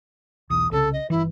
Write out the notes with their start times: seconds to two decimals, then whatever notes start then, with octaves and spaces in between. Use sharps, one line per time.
0.50 B1 E2 D#6
0.71 C2 C#3 A4
0.93 D#5
1.10 G1 E3 E4